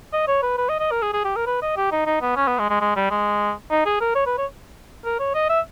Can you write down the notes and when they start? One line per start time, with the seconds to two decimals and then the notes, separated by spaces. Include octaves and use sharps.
0.13 D#5
0.27 C#5
0.43 B4
0.58 B4
0.69 D#5
0.80 D#5
0.91 A#4
1.02 G#4
1.13 G#4
1.25 G4
1.36 A#4
1.47 B4
1.62 D#5
1.77 G4
1.92 D#4
2.06 D#4
2.22 B3
2.36 C#4
2.48 B3
2.59 G#3
2.70 G#3
2.81 G#3
2.96 G3
3.11 G#3
3.71 D#4
3.86 G#4
4.01 A#4
4.15 C#5
4.26 B4
4.38 C#5
5.05 A#4
5.20 C#5
5.35 D#5
5.49 E5